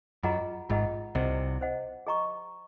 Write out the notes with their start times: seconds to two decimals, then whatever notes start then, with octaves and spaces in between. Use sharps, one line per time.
0.23 F#2 F4 G#4 D#5 F#5 A#5
0.69 G#1 G#2 F4 G#4 D#5 F#5 A#5
1.15 C2 C3 C5 D#5 F#5
1.61 C5 D#5 F#5
2.07 G#4 D#5 A#5 C#6